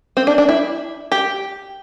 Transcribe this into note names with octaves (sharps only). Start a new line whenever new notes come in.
C4
D4
D4
E4
G4